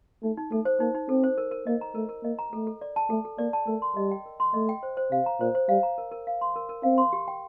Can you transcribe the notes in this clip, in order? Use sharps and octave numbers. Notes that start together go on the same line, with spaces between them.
A3 D#4
D#4
A3 A4
C5
A#3 D#4
D#4
C4 A4
C5
A#4
A#4
A#3 D#5
A#5
A3 A#4
A#4
A#3 D#5
A#5
A3 A4
A4
D5
A5
A3 A4
A4
A#3 D5
A5
A3 A#4
C6
G3 D#5
G5
A#4
C6
A3 D#5
G5
C5
C5
C3 F5
A#5
A#2 C5
C5
G3 F5
A#5
A#4
A#4
F5
C6
A#4
A#4
C4 F5
C6
G4
G5